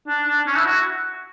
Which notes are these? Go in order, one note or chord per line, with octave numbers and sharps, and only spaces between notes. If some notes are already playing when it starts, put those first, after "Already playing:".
D4
D4
C#4
E4
F#4